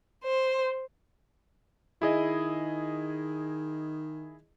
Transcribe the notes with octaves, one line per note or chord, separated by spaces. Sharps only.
C5
D#3 E4 G#4 D#5